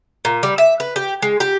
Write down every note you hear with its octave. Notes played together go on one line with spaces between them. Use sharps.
A#2
G3
E5
B4
G4
G#3
G4